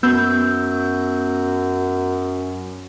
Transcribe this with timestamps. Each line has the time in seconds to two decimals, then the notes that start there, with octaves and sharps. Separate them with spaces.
0.03 F#2 B3 E6 G6